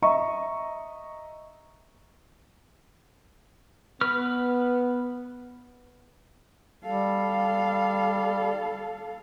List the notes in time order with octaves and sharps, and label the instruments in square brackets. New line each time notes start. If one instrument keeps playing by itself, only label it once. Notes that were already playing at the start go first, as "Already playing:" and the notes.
[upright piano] D#5 E5 A#5 C#6
[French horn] B3 [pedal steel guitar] B4 F6
[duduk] G3 [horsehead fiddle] A4 F5